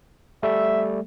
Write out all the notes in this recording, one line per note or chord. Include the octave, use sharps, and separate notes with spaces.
G3 A3 E5